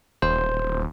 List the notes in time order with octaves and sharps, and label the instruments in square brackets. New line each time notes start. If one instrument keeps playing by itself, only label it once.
[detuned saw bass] D#1 [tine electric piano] C5